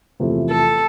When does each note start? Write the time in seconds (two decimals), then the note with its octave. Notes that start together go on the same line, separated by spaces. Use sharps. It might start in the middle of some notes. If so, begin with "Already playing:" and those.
0.20 E2 C3 F3 A3 E4
0.49 A4